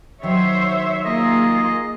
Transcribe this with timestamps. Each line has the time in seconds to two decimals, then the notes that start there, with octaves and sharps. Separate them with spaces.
0.23 D#3 F#3 C5 C#5 E5
1.05 A#3 F4 G#4 D#5